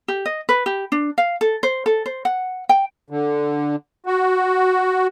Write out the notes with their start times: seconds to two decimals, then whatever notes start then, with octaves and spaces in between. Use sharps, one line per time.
0.08 G4
0.26 D#5
0.49 B4
0.66 G4
0.92 D4
1.18 F5
1.41 A4
1.63 C5
1.86 A4
2.06 C5
2.25 F#5
2.69 G5
3.10 D3
4.06 F#4